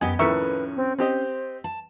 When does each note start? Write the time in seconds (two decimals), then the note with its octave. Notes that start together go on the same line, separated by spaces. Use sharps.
0.01 F#2 B3 G4 D#5 F#5 G#5
0.19 F2 A2 D#3 C#4 A#4 B4 E5 C#6
0.76 C4
0.99 C4 G4 C5 D#5
1.64 A5